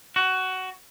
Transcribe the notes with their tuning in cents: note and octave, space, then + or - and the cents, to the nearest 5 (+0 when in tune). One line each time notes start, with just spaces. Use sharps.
F#4 +15